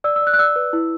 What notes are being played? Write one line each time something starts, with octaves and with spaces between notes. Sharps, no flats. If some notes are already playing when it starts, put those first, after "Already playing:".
D5 E6
E6
D5 F#6
F#6
D5 E6
B4
E4